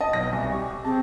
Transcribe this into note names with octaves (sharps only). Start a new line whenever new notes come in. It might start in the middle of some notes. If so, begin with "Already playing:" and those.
D#5 A5 D#6
B1 B3 A#6
C2 G#5
G4 C#6
C4 G#4 A5